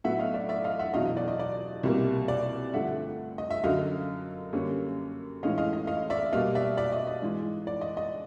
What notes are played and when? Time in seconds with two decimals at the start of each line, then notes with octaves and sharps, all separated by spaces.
0.04 A2 F#3 B3 E5 F#5
0.19 D#5 F5
0.34 D5 E5
0.49 D5 E5
0.64 D#5 F5
0.79 E5 F#5
0.94 E2 B2 F#3 D#5 F5
1.05 D#5
1.17 D5
1.28 D#5
1.39 D5
1.83 C2 B2 G3 A#3
2.28 D5
2.73 G2 D3 F3 A3 E5 F#5
3.38 D#5
3.50 E5
3.64 F#2 D3 F#3 D#5 F5
4.53 F#2 D3 G3 A#3 C#4
5.43 A2 E3 G#3 C#4 D#5 F5
5.58 D#5 F5
5.73 D#5
5.87 D#5 F5
6.10 D5 E5
6.33 B2 G3 A#3 D#5 F5
6.55 D5 E5
6.77 D5 E5
6.92 D#5
7.07 D#5
7.22 G#2 E3 G#3
7.67 D5
7.81 D#5
7.97 D#5